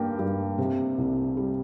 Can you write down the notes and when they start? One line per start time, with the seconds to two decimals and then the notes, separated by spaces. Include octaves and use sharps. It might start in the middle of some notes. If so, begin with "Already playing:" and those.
Already playing: G2 A#3 G5
0.19 G2
0.58 C3
0.98 C2
1.37 G3